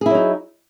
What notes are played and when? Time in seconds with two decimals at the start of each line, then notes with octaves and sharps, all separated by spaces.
0.01 G#4
0.06 E4
0.10 F#3
0.15 D#4